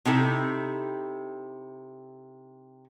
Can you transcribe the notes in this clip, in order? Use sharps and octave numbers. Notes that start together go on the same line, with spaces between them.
C3 D#4 E4 A4